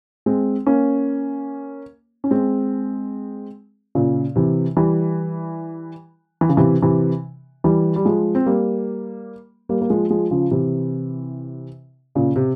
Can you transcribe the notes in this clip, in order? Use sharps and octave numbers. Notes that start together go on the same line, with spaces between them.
G#3 C4
A#3 C#4
C#4
G#3 C4
A#2 C#3
C3 E3
E3 G3
E3
C#3
C3 E3
C3 E3
E3 G3
G3
F3 G#3
C4
G3 A#3
G3 A#3
A#3
F3 G#3
F3 G#3
C#3 F3
C3 E3
A#2 C#3
C3